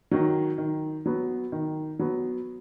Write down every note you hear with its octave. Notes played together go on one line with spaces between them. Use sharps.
D#3 F#3
D#3
F#3 B3
D#3
F#3 B3